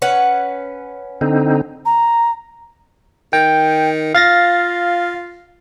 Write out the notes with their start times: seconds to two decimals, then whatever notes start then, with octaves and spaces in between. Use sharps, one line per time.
0.02 C#4 B4 F#5
1.21 D3 C4 D#4
1.85 A#5
3.33 D#3 G5
4.15 F4 F5 A6 A#6